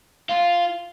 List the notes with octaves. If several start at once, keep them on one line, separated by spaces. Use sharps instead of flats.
F4